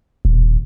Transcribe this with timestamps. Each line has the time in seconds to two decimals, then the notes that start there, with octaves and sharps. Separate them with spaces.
0.25 D#1